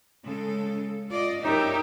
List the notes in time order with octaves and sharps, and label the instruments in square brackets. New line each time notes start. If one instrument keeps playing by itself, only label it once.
[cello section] C#3 G#3 A4
F4 D5 D#5
[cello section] F#2 C#5 E5 [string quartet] D#4 G4 A#4